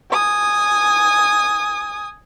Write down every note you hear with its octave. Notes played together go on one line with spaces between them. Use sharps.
G#5 D#6